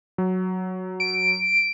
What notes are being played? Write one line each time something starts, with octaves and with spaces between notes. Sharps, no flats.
F#3
D7